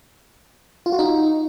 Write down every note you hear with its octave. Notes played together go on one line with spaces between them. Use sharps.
F4
F#4
D#4